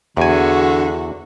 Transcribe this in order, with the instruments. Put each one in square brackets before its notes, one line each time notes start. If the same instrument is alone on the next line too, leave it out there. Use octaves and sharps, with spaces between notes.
[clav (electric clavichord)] E2 G#5 [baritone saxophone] D3 [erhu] F#4